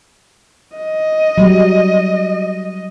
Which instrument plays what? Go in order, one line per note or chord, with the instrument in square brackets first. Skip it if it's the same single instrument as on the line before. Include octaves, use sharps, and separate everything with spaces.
[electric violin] D#5
[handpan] F#3 G3